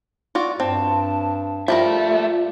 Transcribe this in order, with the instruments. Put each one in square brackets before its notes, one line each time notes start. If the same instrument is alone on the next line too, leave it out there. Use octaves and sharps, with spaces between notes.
[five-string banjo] F4 F#4 D5
[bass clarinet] G2 [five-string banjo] C4 [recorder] A5
[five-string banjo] F3 G3 A#4 [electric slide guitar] A3 E5 [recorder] F4